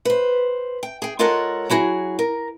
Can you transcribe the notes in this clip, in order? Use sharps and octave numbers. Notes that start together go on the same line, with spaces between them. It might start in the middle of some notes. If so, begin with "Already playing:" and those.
B4 C5
G5
G#4 G5
G#3 F4 A4 A#4 C#5 F#5
F#3 E4 F#4 G#4
A#4